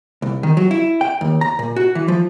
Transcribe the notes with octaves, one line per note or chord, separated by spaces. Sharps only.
C2
D#3
F#3
E4
G5
D#2
A#5
A#2
F#4
E3
F3